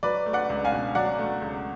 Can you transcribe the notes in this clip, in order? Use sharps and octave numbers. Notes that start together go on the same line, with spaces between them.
F#3 B4 D5
A3
D5 F#5
C#2
F5 G#5
B2
F#3 D5 F#5
A3
C#2